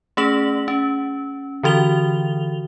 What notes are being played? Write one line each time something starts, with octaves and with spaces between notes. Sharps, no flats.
A3 C#4 G#4 F#7
C#4
D3 E3 F#4 F7 G7